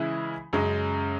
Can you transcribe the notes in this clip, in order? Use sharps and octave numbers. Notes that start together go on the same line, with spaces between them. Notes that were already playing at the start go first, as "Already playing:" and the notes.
Already playing: C#3 E3 G#3 E4
F#2 C#3 G#3 C#4